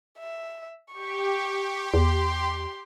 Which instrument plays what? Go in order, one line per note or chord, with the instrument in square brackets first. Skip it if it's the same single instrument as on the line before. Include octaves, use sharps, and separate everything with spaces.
[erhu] E5
[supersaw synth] G4 [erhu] C#6
[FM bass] E2 [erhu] C6